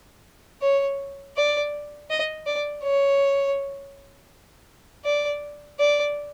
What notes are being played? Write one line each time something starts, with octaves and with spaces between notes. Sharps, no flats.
C#5
D5
D#5
D5
C#5
D5
D5